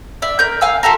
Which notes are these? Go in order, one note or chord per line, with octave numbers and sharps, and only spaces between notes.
D5 E5
A#4 G6
F5 G#5 E6
F4 G4 A4 A#4